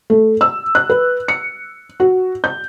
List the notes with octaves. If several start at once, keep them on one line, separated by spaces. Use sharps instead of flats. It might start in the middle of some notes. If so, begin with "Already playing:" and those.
A3
E6
F#6
B4
C#7
F#4
G6